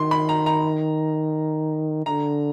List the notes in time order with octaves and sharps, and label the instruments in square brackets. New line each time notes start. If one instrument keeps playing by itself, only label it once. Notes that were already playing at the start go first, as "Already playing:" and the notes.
Already playing: [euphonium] D#3 [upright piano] C6
[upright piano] B5
A#5
A#5
[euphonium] D3 [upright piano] A#5